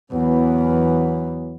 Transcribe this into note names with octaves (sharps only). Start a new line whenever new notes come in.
E2 E3 F#3 B3